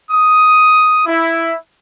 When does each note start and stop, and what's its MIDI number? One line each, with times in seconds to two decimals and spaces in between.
0.10 1.02 87
1.06 1.55 64